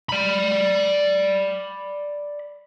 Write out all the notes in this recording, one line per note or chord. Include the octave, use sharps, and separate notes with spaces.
D5 B5